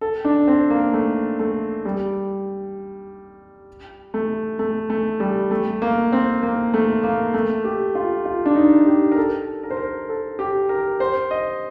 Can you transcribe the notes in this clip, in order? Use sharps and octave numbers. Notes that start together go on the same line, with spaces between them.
A4
D4
C4
A#3
A3
A3
G3
A3
A3
A3
G3
A3
A#3
C4
A#3
A3
A#3
A3
G4
F4
F4
D4
D#4
G4
A#4
A4
A#4
C5
A#4
A4
G4
A#4
C5
D#5